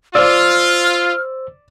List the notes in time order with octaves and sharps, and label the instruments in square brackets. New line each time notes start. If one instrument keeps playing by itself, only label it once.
[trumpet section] F4 [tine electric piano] C5 E6 [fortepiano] D5 [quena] F6